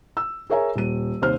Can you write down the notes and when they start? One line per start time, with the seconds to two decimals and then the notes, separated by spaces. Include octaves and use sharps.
0.17 E6
0.50 G#4 A#4 C#5 E5 G#5 A#5
0.76 D#1 D#7
1.22 D#2 C3 C5 F6